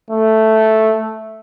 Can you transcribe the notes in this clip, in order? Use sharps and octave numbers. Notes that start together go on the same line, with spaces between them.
A3